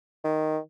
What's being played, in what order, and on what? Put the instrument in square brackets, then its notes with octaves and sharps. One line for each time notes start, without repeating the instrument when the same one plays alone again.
[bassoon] D#3